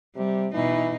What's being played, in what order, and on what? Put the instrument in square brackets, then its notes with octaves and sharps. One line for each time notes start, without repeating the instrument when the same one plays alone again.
[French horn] C3 [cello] G3
[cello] B2 D#4 [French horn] E3